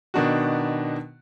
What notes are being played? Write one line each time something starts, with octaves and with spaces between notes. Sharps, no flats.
B2 D#3 D4 D#4 F#4